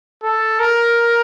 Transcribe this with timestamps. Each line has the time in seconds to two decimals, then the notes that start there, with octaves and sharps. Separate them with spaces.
0.23 A4
0.59 A#4